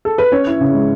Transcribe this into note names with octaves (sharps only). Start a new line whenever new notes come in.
A4
B4
C#4 C#5
E4
C#3
G#3